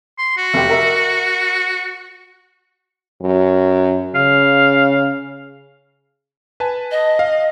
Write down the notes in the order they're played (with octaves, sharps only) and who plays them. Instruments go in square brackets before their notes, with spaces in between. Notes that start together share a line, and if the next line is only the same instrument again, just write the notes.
[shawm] C6
F#4
[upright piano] F1 G4
A#4 E5
[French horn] F#2
[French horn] C#3 [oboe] F5
[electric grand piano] B4 G#5 A5
[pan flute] D#5
[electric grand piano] F5